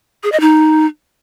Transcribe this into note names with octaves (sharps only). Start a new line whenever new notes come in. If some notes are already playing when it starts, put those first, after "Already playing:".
G#4
D#5
D#4